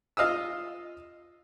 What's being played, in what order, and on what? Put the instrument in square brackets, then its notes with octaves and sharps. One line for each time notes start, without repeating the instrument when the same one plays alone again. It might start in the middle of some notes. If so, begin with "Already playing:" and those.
[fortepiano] F4 D#5 F5 D#6 E6